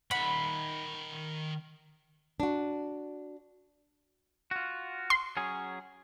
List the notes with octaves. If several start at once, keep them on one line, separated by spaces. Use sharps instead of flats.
D#3 F#5 B5
D4 F#4
F4 F#4
C6
F#3 C#4 G#4